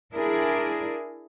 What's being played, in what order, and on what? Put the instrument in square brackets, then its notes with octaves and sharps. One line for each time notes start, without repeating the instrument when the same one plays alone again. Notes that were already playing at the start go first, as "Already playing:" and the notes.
[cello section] D4 E4 G#4 A#4